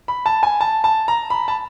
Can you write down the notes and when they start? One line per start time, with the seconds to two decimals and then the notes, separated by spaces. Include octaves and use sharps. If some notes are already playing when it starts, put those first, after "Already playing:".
0.08 B5
0.26 A5
0.43 G#5
0.61 A5
0.84 A5
1.08 A#5
1.30 B5
1.48 A5